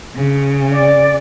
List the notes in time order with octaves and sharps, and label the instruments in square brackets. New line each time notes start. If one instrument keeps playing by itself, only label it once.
[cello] C#3
[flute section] D5